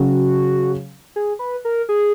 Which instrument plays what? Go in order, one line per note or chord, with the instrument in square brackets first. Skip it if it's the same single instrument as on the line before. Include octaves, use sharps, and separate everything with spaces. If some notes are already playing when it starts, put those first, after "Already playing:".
Already playing: [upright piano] C#3 F#3 C#4 [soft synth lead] F#4
[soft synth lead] G#4
B4
A#4
G#4